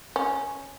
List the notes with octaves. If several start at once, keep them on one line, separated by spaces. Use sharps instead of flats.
C#4